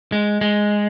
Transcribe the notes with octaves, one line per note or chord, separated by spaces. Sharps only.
G#3
G#3